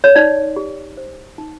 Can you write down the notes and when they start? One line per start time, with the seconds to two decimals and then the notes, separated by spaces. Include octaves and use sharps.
0.04 C#5
0.15 D#4 D5
0.56 G4
0.97 C5
1.38 D#4